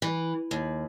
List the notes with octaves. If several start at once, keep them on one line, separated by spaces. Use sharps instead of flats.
E3
D#2